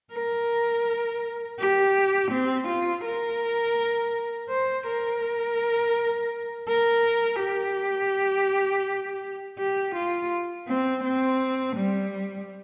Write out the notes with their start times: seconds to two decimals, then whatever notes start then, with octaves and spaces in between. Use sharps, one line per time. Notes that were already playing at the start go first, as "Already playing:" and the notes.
0.13 A#4
1.59 G4
2.31 C4
2.68 F4
3.04 A#4
4.49 C5
4.86 A#4
6.68 A#4
7.40 G4
9.58 G4
9.95 F4
10.68 C4
11.04 C4
11.77 G3